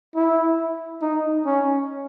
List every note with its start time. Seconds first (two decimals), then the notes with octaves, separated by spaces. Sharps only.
0.15 E4
1.02 D#4
1.46 C#4